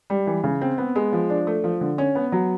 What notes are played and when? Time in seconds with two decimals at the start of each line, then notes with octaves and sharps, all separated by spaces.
0.10 G3
0.27 E3
0.44 C#3
0.61 C4
0.78 B3
0.95 G#3
1.13 F3
1.30 D4
1.47 A3
1.64 F3
1.81 D3
1.98 C#4
2.15 B3
2.32 F#3